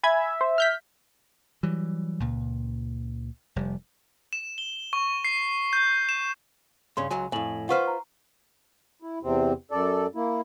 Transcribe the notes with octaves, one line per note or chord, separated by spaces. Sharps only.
E5 G#5 B5 G#6
C5
F6 G6 B6
E3 F#3 G3
C#2 A#2
F1 G3
E7
G7
C#6
C7
G6
E7
G2 C#3 C#4 C6
C#2 F#3 G#5
F2 A2 G#5 F#7
F4 B4 C5 F#5 C#6 F6
A#5
E4
E2 C3 C4
F#2 A4 D5
A#3 E4